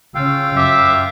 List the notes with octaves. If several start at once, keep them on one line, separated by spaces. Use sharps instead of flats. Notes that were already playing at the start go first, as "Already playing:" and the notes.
C#3 C#4 F4 F5 G5 E6
F#2 E5 D6